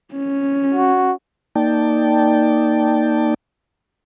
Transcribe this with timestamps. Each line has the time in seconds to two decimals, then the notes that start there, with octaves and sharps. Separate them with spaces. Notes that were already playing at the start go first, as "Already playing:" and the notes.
0.13 C#4
0.74 F#4
1.55 A#3 D#4 D5 G5 A5